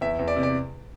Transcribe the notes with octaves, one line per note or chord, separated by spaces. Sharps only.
E2 E5
E2
D5
C3
D5